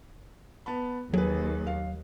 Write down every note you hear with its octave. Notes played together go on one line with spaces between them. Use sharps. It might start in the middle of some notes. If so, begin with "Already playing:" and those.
B3 A5 B5
D#2 F#3 G#4 B4
F5